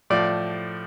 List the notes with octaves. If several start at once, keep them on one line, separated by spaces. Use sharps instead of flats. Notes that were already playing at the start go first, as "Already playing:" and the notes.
A2 F3 D5